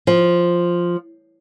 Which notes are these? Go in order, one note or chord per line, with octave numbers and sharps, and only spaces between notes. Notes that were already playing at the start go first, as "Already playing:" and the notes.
F3